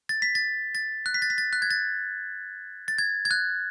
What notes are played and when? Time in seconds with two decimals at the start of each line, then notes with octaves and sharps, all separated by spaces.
0.09 A6
0.22 B6
0.35 A6
0.75 A6
1.06 F#6
1.14 B6
1.22 A6
1.30 B6
1.38 A6
1.53 F#6
1.62 G#6
1.71 A6
2.88 A6
2.99 G#6
3.25 G#6
3.31 F#6